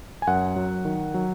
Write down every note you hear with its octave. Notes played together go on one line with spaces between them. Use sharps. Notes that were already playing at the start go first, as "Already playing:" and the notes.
G#5
F#2 F#5
F#3
D#3
F#3